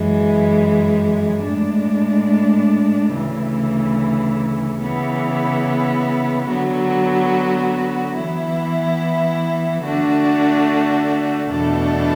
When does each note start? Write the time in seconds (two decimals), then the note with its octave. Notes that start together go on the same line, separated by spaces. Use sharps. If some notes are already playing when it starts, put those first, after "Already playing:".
Already playing: F#2 E3 G#3
1.44 A2 G#3 D4
3.12 D2 C#3 E3
4.80 C#3 E3 B3
6.47 D3 F#3 B3 F#4
8.16 E3 B3 E4
9.83 D3 A3 D4 F#4
11.50 E2 B2 A3 D4 A4